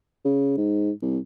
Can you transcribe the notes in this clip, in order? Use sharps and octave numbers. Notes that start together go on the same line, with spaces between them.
C#3
G#2
C2